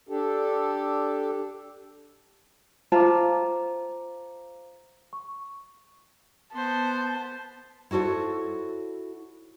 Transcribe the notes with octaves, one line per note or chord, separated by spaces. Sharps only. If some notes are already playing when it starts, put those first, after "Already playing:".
D4 G4 A4
F4 C5 A5 A#5 D6
C#6
B3 C5 A5
E4 F#4 A4 C5 C#5